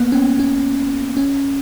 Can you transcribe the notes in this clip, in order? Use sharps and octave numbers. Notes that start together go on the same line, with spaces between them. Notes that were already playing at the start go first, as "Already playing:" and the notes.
Already playing: A#3 B3
C#4
C#4
C#4